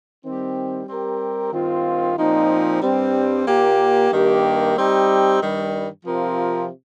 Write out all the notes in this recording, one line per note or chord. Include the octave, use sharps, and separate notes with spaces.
D#3 G3 C4 G4
G3 C4 G4 A#4
G2 D#3 C4 F4
A#2 F3 C4 D#4
G2 G3 C4
A#2 A#3 G4
G2 D#3 A#3 G4 A#4
G3 C4 D#4 G4
G2 D#3 G3
C3 F3 C4 F4 A#4